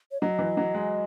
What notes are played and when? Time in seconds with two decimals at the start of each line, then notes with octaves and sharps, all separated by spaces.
0.12 C#5
0.21 F#3 D#5
0.39 E3
0.57 F#3
0.74 G#3